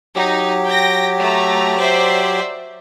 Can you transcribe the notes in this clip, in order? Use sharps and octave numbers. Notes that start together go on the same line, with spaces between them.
F#3 D#4 G4
G5 A#6
A3 A#5
C5 D5 E5